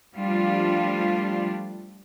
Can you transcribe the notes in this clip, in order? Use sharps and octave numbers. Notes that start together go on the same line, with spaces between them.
F3 G3 A3 D4 F4